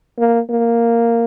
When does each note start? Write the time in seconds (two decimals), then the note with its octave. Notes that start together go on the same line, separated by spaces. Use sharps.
0.19 A#3
0.50 A#3